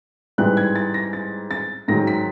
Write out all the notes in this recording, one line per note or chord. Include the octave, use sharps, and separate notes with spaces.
G#2 E3 G3 B3 F#6
G#6
A6
A#6
A6
A6
G#2 D#3 F#3 A#6
B6